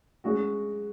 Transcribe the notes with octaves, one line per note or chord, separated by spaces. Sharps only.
G#3 C#4 F#4